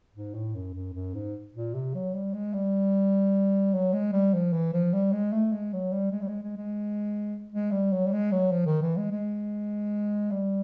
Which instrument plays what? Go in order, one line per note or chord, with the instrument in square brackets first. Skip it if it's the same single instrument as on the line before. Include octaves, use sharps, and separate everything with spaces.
[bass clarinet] G#2
A2
F#2
F#2
F#2
G#2
A#2
C3
F#3
G3
G#3
G3
F#3
G#3
G3
F3
E3
F3
G3
G#3
A3
G#3
F#3
G3
G#3
G3
G#3
G#3
G#3
G#3
G3
F#3
G3
G#3
F#3
F3
D#3
E3
G#3
G#3
G3